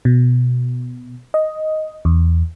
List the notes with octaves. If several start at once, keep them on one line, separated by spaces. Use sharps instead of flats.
B2
D#5
E2